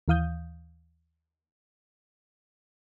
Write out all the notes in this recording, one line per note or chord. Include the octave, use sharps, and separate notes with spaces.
D#2 E3 F5 D#6 G6